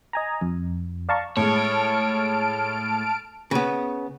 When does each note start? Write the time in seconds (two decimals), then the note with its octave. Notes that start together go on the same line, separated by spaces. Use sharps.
0.13 D#5 G#5 A#5
0.41 F2
1.09 D5 F5 A5 A#5 C#6
1.37 A2 G#3 C#5 A5 F6 D7
3.51 C#3 B3